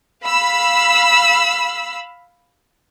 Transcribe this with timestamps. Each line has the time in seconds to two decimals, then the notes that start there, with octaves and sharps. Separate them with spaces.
0.24 F5 B5 E6